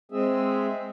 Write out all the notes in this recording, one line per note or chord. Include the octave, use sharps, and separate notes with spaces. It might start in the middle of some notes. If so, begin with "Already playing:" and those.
G#3 C4 G#4 E5